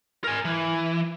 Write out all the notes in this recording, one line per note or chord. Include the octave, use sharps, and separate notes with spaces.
A#4 G#5
E3